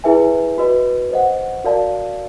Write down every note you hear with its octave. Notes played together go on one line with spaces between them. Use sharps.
E4 G#4 B4 E5 G#5
F#4 B4 D#5
C5 D#5 F#5
F#4 A#4 D5 F5 A5